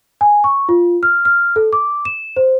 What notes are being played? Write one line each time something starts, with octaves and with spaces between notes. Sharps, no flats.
G#5
C#6
F4
F6
F6
A4
D6
E7
C5